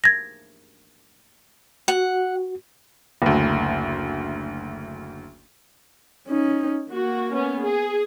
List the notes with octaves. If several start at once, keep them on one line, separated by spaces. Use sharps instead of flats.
G#6 A#6
F#4 F#5
F#1 D2
C#4 D#4
A#3 F#4
B3 C#4
G#4